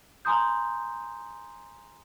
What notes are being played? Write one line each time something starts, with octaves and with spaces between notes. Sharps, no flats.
G#5 A#5 C6 D#6 G6